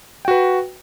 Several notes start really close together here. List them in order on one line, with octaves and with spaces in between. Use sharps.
G5 F#4 B4